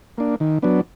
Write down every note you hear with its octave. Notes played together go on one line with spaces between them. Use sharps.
A#3 D4
D#3
F#3 B3 D4